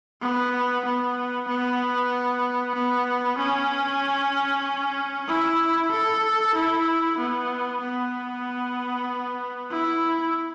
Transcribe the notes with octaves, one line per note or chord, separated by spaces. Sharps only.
B3
B3
B3
B3
C#4
E4
A4
E4
B3
B3
E4